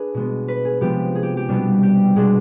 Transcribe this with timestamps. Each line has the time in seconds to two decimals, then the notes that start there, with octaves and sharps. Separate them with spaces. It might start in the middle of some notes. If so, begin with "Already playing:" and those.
Already playing: D4 G#4 B4
0.14 B2 G#3 B3
0.48 B4
0.65 G#4
0.81 C3 F3 G#3 B3 G4
1.15 G#4
1.23 G4
1.37 G4
1.49 B2 G3 B3 D4
1.83 G4
2.16 B2 G#3 D4 G#4